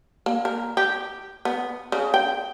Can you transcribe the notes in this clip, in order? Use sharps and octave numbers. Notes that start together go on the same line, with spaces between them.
A#3
A#4
G4
B3
C#3
G5